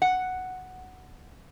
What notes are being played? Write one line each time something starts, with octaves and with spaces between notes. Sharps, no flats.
F#5